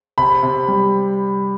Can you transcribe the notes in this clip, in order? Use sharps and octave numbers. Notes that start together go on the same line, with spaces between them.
C3 B5
C3
G3